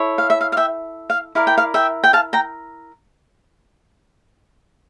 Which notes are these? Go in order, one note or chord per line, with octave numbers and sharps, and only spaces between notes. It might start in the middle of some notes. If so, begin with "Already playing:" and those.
Already playing: E4 A4 C#5
F5
E5
F5
F5
E5 G5
F5
E4 A#4 D5 F5
G5
F5
E5 G5
G5
F5 A5
G5 A#5